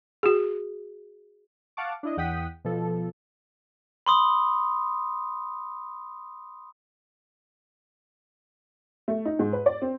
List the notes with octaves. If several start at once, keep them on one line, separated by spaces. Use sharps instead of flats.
F#4 G#4
F5 F#5 A5 C#6 D6
D4 E4 D#5
E2 F#5 G5 D#6 B6
B2 F3 A4
B5 C6 D#6
A3
D#4
G#2
B4
D5
C4